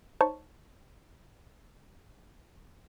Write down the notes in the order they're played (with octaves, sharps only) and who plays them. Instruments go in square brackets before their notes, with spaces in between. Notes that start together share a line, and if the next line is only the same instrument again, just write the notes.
[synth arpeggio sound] D#4 C5 C#5 A5 C#6